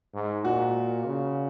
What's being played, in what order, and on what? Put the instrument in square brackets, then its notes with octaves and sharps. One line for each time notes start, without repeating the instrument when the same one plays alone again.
[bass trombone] G#2
[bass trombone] A#2 [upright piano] F#4
[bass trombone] C#3